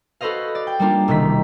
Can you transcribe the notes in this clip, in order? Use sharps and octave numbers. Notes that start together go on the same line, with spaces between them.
F#4 A4 B4 C5 D#5 F5
D5
G5
G3 A#3 D4 F4
E1 C3 D#3 B6